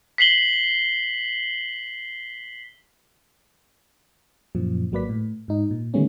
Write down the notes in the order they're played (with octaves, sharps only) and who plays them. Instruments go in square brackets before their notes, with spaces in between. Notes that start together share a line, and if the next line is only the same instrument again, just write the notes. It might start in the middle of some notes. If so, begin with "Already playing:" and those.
[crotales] B6 C7 F#7 G7
[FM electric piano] F#2 A#2 F3
G#1 F#3 A#3 B4 D5 B6
A2
G#2 D#4
A#2
D3 D#3 G3 A3 B3 C#4